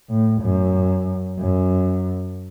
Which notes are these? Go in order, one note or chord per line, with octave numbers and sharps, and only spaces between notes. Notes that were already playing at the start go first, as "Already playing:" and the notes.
A2
F#2
F#2